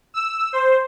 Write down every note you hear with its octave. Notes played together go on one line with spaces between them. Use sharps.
E6
C5